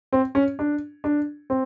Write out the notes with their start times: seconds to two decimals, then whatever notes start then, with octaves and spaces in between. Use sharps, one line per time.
0.13 C4
0.35 C#4
0.59 D4
1.04 D4
1.50 C4